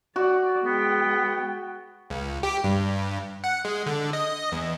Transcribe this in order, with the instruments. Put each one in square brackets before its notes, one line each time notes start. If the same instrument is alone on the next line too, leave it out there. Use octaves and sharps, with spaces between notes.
[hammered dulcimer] F#4 [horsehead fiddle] D5
[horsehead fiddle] G#3 G5 [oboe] B3
[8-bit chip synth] C#2
G4
G2
F#5
G#3
D3
D#5
E2